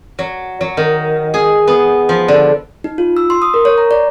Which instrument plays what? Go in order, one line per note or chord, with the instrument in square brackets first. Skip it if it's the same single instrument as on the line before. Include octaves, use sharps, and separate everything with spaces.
[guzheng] F#3
F#3
D#3
G#4
B3
F3
D3
[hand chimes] D#4
F4
E6
C6
D#6
A#4
C#5
A#5
D5